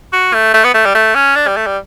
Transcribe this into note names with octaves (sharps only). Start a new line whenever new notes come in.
F#4
A3
A3
B3
A3
G3
A3
C#4
D4
G3
A3
G3